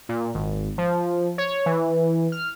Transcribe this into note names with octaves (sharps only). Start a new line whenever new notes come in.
A#2
G#1
F3
C#5
E3
F6